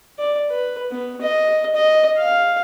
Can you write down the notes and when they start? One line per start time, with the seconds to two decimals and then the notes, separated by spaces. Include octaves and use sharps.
0.19 D5
0.50 B4
0.91 B3
1.22 D#5
1.75 D#5
2.18 F5